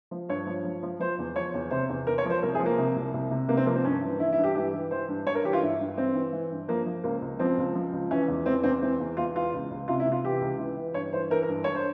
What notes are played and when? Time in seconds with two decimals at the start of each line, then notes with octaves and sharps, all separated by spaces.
0.11 F3
0.29 G2 C#5
0.46 F3
0.64 F3
0.83 F3
1.00 F3 C5
1.19 E2
1.36 F3 C#5
1.54 E2
1.71 C3 C5
1.89 E2
2.07 E2 A#4
2.18 C#5
2.25 F3 C5
2.42 C2 A#4
2.55 G#4
2.60 F3
2.66 A#3
2.78 C3
2.96 C2
3.13 C2
3.31 C3
3.48 C3 A#3
3.57 C4
3.66 F3 A#3
3.75 C4
3.84 G2 C#4
4.02 E3
4.20 E3 E4
4.32 E4
4.37 G2
4.44 G4
4.55 E3 G4
4.73 E3
4.91 E3 C5
5.08 G2
5.26 G2 C#5
5.35 A#4
5.44 E3 G4
5.53 F4
5.62 G2 E4
5.80 G2
5.98 E3 C4
6.15 E3
6.33 E3
6.51 G2
6.68 F3 A#3
6.86 F3
7.04 C#2 A#3
7.21 C#2
7.39 F3 C4
7.58 C#2
7.75 F3
7.93 C#2
8.11 E3 C#4
8.28 E2
8.46 E3 C4
8.63 E2 C4
8.82 E3 C4
9.00 E2
9.17 E2 F4
9.35 E3 F4
9.53 C#2
9.71 C#2
9.88 C3 F4
10.00 E4
10.06 C3
10.12 F4
10.24 E3 G4
10.41 C#2
10.59 E3
10.77 E3
10.94 G2 C#5
11.13 E3 C5
11.30 E3 A#4
11.43 A#4
11.49 G2
11.64 G2 C#5
11.75 C5